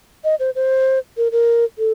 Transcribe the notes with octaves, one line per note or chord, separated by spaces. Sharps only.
D#5
C5
C5
A#4
A#4
A4